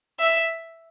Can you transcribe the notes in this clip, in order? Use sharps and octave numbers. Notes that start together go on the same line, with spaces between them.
E5